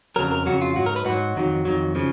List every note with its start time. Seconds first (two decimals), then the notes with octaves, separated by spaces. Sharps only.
0.16 F2 C#3 F#3 A#4
0.32 A#4
0.46 F2 C#3 F#3 F#4
0.61 F4
0.76 G#2 F#3 F#4
0.86 A#4
0.96 B4
1.05 G#2 F#3 F#4
1.36 F2 D#3 F#3
1.65 F2 D#3 F#3
1.95 C#3 F3